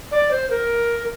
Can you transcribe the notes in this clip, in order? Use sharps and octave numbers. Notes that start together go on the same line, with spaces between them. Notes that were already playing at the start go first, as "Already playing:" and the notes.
D5
C5
A#4